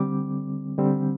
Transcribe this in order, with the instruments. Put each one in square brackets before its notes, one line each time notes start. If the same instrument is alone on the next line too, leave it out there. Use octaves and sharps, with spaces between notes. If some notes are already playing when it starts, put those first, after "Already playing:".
Already playing: [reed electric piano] D3 G3 C4 D6
D3 G3 C4